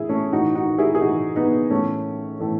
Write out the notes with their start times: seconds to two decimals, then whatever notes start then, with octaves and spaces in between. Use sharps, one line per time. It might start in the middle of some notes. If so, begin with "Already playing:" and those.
Already playing: A2 E3 E4 G#4
0.09 A3 C#4
0.32 A2 E3 D#4 F#4
0.55 D#4 F#4
0.78 E4 G#4
0.95 G#4
1.01 A2 E3 D#4 F#4
1.36 B3 D#4
1.70 A2 E3 A3 C#4
2.40 A2 E3 A3